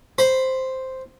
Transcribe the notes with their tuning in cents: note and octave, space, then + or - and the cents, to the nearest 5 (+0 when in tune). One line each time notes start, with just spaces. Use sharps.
C5 +0 B5 +10